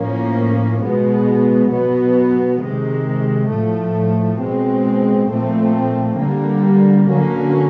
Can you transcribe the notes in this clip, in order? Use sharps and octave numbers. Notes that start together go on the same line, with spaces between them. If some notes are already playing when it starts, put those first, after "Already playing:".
Already playing: A2 F3 A#3 C#4
B2 G#3 B3
B2 F#3 B3
C3 D#3 G#3
A2 F3 A3
B2 G#3 C4
A#2 F3 A3 C4
D3 G3 A#3
D3 F#3 A#3 C#4